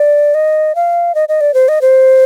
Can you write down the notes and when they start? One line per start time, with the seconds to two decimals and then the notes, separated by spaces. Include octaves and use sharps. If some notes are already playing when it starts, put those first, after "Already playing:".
Already playing: D5
0.34 D#5
0.75 F5
1.15 D#5
1.29 D#5
1.41 D5
1.54 C5
1.68 D#5
1.81 C5